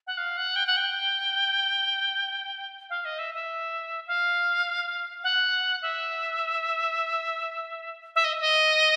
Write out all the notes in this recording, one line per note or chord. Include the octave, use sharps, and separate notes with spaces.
F#5
F5
F#5
G5
F#5
G5
F5
D#5
E5
E5
F5
F#5
E5
E5
D#5
D#5